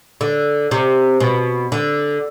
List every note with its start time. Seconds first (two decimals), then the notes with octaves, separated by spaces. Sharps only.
0.21 D3
0.71 C3
1.20 B2
1.72 D3